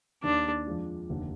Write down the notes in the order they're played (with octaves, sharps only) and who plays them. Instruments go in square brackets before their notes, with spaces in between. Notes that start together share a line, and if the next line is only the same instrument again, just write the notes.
[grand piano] D#2 D#3 A#3 [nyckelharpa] D4
[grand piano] F2 F3 G#3 D4 F4
F1 D#2 D3